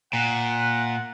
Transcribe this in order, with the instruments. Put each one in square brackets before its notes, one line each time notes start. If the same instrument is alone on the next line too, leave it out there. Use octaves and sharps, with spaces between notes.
[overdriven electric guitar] A#2 [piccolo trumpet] F#5